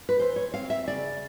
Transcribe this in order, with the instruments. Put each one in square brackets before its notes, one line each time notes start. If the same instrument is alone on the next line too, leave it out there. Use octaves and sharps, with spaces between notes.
[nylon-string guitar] B4
E3 C5
C#5
C4 F5
E5
C#3 D5